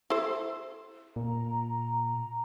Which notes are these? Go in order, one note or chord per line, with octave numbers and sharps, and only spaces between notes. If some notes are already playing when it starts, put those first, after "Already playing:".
E4 A4 C5
A#2 A#5